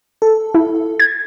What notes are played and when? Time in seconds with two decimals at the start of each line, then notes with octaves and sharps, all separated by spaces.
0.22 A4
0.54 E4
1.00 G#6